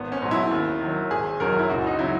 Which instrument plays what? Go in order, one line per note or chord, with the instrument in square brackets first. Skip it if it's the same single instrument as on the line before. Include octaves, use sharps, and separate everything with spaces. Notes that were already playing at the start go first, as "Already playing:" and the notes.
Already playing: [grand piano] G#1 B3
C#4
G#2 F#3
E4
D#2
D#3 F#3
G#1 G#4
F#2 D#3 F#3 A#4
E4
C#2 F#4
D#4
C#3 F#3 E4